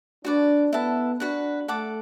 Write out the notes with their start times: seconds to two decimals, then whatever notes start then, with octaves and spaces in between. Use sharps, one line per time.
0.24 D4 F#4 B4 D5
0.72 B3 E4 A4 F#5
1.20 D4 F#4 B4 F#5
1.68 A3 A4 F#5 D6